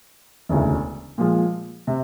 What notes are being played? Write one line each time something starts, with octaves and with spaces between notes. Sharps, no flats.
E1 D2 C#3 E3
A#2 F3 G#3
C3